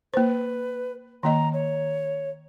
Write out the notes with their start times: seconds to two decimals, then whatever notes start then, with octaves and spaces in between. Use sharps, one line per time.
0.14 A#3 B4 C5
1.23 D#3 A#3 D#5 A#5
1.53 C#5